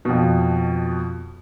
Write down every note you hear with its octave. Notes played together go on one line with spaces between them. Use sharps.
F2 B2